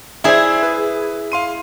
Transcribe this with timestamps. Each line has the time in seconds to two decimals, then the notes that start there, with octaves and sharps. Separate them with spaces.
0.24 E4 G#4 C5 D5 E5
0.63 B4
1.32 F5 C6 D#7